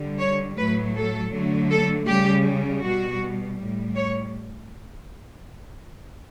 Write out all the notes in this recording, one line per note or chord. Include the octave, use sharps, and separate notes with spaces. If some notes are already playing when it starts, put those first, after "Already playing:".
Already playing: D3 G3
C#5
A2 F#3 A3 B4
A4
D3 F#3 A3
A4
C#3 G3 G4
B2 G3 F#4
A2 G3
C#5